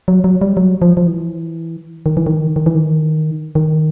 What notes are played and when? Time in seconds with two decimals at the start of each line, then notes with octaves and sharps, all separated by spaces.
0.08 F#3
0.24 F#3
0.41 G3
0.57 F#3
0.82 F3
0.97 F3
1.07 E3
2.06 D#3
2.17 E3
2.27 D#3
2.56 D#3
2.66 E3
2.75 D#3
3.55 D#3